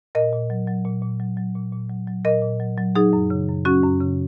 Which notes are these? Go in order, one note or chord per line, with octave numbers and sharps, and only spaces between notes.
A#2 A#4 D#5
A#2
F#3
F#3
A#2
A#2
F#3
F#3
A#2
A#2
F#3
F#3
A#2 A#4 D#5
A#2
F#3
F#3
F#3 D#4 G#4
F#2
C#3
F#2
F#3 C#4 F#4
F#2
C#3